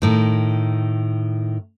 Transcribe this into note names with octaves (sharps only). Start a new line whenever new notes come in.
A2 D#3